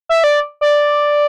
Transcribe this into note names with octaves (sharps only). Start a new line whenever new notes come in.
E5
D5
D5